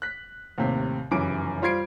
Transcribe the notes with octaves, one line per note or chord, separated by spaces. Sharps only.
F#6 B6
D#2 A2 C3
F1 F#2 C#3 E3 D6 D7
G3 F4 C5 G#6 C7 D7